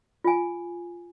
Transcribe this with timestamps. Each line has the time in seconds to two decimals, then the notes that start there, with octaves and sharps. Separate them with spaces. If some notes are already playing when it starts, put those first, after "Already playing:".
0.24 F4 G#5